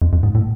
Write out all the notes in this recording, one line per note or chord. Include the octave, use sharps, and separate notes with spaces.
F2
F2
G#2
A2